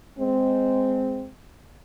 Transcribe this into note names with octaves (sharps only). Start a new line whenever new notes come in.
G#3 C4